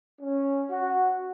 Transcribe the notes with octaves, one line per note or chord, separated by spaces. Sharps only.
C#4
F#4